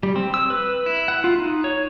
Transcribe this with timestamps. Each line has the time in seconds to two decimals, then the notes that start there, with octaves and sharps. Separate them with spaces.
0.03 G3
0.16 C4
0.34 E6
0.50 B4
0.86 E4
1.08 F#5
1.24 F4
1.39 D#4
1.64 C#5